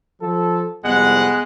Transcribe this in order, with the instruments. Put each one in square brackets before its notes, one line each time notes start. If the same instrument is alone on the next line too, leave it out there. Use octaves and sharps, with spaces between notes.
[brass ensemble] F3 A4
[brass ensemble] C2 F2 [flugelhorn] G#3 [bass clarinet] B3 [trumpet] F#5